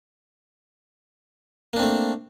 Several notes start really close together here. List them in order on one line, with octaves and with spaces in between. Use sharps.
A#3 D4 C4 A3